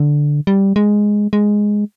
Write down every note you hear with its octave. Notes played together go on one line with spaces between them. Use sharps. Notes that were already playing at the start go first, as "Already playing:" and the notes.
Already playing: D3
G3
G#3
G#3